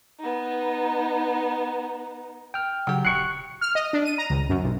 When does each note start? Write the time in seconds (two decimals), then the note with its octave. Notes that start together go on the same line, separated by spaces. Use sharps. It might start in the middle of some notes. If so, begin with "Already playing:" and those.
0.19 B3 D#4
2.54 G5 F6
2.87 C#3 F#3 G4
3.05 D#1 C#6 F#6 C7 C#7
3.61 F6
3.75 D#5
3.93 D4
4.05 D#7
4.18 A#5
4.30 C#2
4.49 F#2
4.63 B1